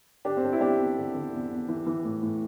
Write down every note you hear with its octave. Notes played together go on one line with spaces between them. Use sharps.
D3 D4 G4
C4
D3 D4
E4
E2 D4 G4
E2
D3
D3
E2
E2
E3
E3
A2
A2